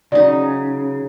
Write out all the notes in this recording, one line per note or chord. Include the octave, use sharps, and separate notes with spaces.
C#3 F#3 D#4 D5